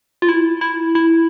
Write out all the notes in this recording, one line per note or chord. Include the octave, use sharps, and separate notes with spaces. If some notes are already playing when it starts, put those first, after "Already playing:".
F4
E4
E4
E4